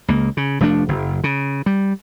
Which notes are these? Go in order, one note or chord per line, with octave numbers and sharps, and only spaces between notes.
C#2 A#3
C#3
F1 F3 A3 D4
F#1
C#3
G3